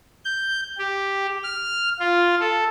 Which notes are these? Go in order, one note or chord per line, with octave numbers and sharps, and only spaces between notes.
G6
G4
F6
F4
A4